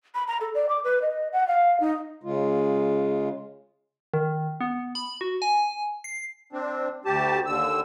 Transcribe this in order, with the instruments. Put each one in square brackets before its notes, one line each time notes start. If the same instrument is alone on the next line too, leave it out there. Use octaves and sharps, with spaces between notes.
[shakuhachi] B5
A#5
A4
D5
D6
B4
D#5
F#5
F5
D#4
[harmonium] C#3 G#3 F4
[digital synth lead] D#3
B3
B5
F#4
G#5
C7
[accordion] C4 D4
D2 G4 A5
D#2 D3 E6